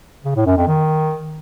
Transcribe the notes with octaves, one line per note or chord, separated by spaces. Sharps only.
C#3
A2
F#2
F2
D#3